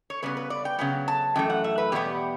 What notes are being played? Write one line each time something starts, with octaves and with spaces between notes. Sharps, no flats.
C#5
C#3 G3 B3 B4
B4
D5
G5
C#3 F#3 B3 G5
A5
F#2 E3 A3 G5
F#5
E5
B4
E2 B2 G3 B3 G4